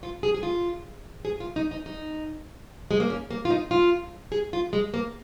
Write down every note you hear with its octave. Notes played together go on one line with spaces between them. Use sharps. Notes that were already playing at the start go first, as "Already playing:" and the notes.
F4
G#4
G#4
F4
G#4
F4
D#4
D#4
D#4
G#3
A#3
C#4
A#3
F4
D#4
F4
G#4
F4
G#3
A#3